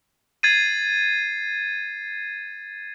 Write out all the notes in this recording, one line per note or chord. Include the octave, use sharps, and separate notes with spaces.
G#6 A6 C7 D#7